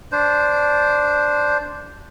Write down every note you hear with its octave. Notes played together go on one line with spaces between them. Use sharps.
D4 C5